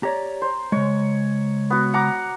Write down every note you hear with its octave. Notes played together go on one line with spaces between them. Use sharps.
G4 C#5 D5 A#5
C5
C#3 G#3 C#5
B3 F#4
F#5 A#5 D6